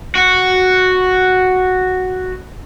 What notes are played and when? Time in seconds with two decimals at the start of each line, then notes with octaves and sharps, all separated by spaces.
0.15 F#4